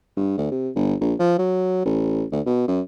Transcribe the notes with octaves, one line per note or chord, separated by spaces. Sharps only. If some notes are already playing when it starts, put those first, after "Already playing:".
G2
D2
C3
G1
A#1
F3
F#3
A1
D2
B2
F#2